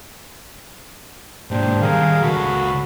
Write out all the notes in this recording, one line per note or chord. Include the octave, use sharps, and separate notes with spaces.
G#2 A#3 D4 G4 C5
D#3 G3 G#4 A#4 F5
C#2 F#4 A4 B5